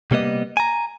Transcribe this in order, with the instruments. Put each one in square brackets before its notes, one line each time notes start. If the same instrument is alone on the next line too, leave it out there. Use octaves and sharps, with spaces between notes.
[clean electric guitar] C3 G3 A#3 B3 D#5
G#5 A#5